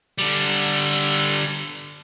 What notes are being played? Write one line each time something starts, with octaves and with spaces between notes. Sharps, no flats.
D3 G3